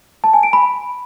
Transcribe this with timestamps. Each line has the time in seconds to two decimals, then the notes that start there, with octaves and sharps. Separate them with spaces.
0.24 A5
0.33 G#5
0.43 D7
0.53 B5